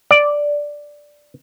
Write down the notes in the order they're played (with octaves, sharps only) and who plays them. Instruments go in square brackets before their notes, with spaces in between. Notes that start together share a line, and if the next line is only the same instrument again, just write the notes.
[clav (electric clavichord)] D5